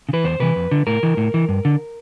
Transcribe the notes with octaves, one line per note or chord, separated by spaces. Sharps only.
C#3
E3 B4
E2 C5
C3 E3 B4
F2
D3
A2 A#4
E3
A2
E3
G2
D3